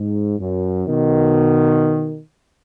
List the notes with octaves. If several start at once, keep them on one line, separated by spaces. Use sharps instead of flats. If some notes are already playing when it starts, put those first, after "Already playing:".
Already playing: G#2
F#2
B2 D#3